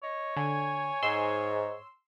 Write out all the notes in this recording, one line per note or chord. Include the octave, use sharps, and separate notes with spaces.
C#5 D#5
D3 G#5
G#2 C6 E6